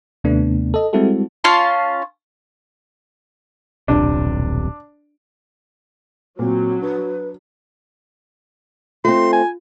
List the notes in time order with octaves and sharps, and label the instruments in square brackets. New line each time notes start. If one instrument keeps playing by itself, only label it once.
[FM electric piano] D#2 C3 A3 B3 D4
A4 D#5
G3 G#3 C4 E4 F#4 A4
[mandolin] C#4 F4 A5 C6
[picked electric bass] D#1 B1 C3 [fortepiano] D4
[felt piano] A#2 [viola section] F#3 [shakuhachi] C4
[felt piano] D4 [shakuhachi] B4
[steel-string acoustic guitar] A3 C4 [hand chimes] F4 [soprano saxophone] C6
[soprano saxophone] G#5